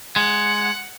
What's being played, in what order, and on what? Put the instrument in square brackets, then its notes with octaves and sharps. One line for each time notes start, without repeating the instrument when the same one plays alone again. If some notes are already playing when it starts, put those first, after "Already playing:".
[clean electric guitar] G#3 [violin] F#5